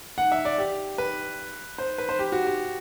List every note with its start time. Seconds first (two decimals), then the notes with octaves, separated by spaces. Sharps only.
0.18 F#5
0.32 E5
0.45 D5
0.58 G4
0.98 B4
1.78 C5
1.98 B4
2.09 C5
2.19 G4
2.32 F#4
2.47 G4